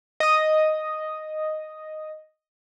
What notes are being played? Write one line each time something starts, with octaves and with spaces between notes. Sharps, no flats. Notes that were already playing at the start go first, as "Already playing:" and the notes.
D#5 D#6